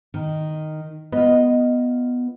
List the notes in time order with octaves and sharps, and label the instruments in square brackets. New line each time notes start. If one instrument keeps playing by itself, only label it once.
[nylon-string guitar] D#3
[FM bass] B3 [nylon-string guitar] F4 D#5